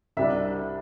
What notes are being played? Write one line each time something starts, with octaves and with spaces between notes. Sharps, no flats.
C2 C3 G3 D4 E5